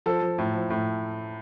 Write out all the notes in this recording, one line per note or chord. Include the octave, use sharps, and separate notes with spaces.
F3 A4
F3
A2
F3
A2